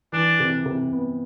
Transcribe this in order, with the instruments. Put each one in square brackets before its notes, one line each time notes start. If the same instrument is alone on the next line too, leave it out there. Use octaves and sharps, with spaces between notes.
[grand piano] E3 [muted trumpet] D4
[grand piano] C3
C3
B3